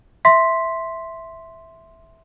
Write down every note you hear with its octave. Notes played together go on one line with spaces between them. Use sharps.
E5 C6 B6